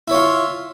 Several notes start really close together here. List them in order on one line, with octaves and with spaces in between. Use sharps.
E4 C#5 F4